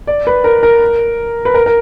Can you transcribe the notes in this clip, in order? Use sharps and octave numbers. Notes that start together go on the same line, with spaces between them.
D5
B4
A#4
A#4
B4
A#4
A#4